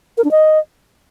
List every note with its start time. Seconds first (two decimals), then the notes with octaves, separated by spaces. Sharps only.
0.18 A#4
0.24 D4
0.31 D#5